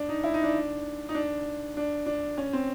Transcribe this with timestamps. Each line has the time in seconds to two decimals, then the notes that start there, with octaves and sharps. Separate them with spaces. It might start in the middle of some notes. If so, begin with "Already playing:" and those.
Already playing: D4
0.09 D#4
0.24 E4
0.34 D#4
0.43 D4
1.09 D#4
1.15 D4
1.77 D4
2.06 D4
2.37 C#4
2.53 C4